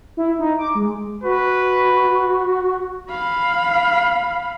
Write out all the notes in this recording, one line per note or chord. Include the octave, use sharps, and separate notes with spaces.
E4
D#4
D6
G#3
F#4 B4
F5 B5